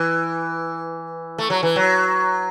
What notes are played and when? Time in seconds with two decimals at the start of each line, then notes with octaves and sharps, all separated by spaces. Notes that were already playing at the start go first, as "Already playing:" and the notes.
Already playing: E3
1.38 A3
1.50 F#3
1.63 E3
1.76 F#3